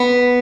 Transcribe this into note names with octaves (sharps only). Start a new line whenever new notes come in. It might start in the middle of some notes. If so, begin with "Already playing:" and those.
Already playing: B3